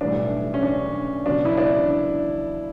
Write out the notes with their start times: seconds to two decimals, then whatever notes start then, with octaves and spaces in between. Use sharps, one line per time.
0.01 B1 A2 E3 G3 D4
0.54 C#4
0.63 D4
1.26 C#2 B2 F#3 D4
1.45 E4
1.57 D4